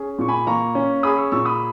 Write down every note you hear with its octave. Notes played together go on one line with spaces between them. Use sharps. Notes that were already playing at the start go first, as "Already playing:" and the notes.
Already playing: C#4 G#4
A#2 C#6
G#5 B5
A#3 A#5 C#6
C#4
G#4 B5 D#6
C#6 E6
A#2 C#6 E6
B5 D#6